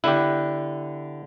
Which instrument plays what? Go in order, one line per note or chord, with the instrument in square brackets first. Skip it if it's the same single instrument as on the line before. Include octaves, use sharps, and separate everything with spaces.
[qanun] D3 B3 B4 [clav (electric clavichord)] E4 G4